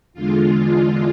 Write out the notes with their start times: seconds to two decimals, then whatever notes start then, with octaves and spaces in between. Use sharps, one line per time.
0.14 E2 D3 G#3 F4